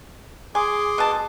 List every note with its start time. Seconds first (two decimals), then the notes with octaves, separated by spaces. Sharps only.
0.55 G#4 G#5 C6 D6
0.98 B2 A5